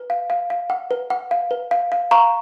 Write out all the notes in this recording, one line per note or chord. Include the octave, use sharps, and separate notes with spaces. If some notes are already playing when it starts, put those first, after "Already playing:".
Already playing: B4
F5
F5
F5
F#5
B4
F#5
F5
B4
F5
F5
F5 A#5 C#6